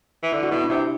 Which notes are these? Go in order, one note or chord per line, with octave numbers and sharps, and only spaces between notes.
E3
D3 E4
F#4
B2 E4
D4
C3 E4